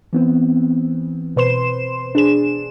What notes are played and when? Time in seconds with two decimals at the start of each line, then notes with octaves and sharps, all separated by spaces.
0.13 E3 B3 C4
1.36 B2 B4 C5 C6 E7
2.15 D4 G#4 E7